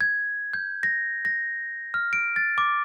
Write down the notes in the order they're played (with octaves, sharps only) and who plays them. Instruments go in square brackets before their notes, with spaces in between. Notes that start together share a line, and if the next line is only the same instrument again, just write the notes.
[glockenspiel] G#6
G6
A#6
A#6
F6
D7
A6
D6